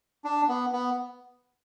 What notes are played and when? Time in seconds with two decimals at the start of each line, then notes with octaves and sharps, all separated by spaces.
0.25 D4
0.48 B3
0.73 B3